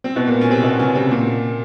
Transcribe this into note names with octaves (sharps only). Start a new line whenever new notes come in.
C4
B2 B3
A#2 A#3
C#4
C3 C4
B2 B3
C#3 C#4
C3 C4
A#2 A#3